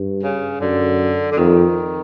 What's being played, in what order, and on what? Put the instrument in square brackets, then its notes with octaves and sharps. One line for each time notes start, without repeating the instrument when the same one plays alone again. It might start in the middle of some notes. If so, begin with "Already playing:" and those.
Already playing: [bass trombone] G2
[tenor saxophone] C#3
[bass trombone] F#2 [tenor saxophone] D3
[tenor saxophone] D3
[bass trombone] F2 [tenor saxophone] D#3